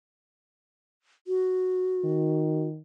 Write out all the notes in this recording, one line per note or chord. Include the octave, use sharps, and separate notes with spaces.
F#4
D#3